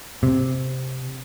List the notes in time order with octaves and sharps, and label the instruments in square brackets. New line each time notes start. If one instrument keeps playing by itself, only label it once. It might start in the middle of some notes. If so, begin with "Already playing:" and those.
[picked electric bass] C3